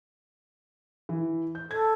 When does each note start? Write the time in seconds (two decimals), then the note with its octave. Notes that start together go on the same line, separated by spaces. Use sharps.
1.09 E3
1.55 G6
1.71 A4 G#6